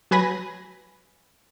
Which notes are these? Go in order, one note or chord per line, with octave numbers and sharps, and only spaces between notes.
F#3 B4 G#5 B5 A#6